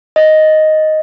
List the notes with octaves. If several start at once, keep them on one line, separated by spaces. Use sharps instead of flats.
D#5